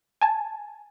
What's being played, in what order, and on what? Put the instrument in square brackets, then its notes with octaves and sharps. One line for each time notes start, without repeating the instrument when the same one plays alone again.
[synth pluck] G#5 A5